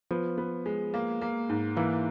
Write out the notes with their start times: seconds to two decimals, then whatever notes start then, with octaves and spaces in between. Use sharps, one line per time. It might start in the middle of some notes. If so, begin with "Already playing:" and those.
0.11 F3 B3
0.38 B3
0.66 G#3
0.94 A#3
1.21 A#3
1.49 G#2
1.76 E3 A#3